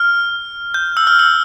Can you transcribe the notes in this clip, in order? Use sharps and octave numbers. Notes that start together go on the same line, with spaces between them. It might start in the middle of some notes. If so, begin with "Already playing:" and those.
Already playing: F6
G6
E6
F6
E6